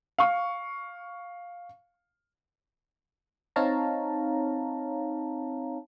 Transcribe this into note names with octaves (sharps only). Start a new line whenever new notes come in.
F5 C#6
C4 D#4 C#5 F5 A5 A#5